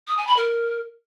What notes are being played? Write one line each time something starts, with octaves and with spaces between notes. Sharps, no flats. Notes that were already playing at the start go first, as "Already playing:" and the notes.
D#6
G#5
B5
A#4